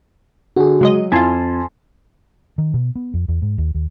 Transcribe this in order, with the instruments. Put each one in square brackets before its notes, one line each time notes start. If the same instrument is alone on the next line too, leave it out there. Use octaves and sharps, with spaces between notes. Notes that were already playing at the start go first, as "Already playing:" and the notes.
[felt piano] D3 [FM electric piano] F#4 G#4
[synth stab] C#3 G#3 D#5 [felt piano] F#3
[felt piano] F2 [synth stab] E4 F4 [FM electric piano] G#5 A5 C6
[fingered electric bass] D#3
B2
B3
F2
E2
G#2
D#2
D#2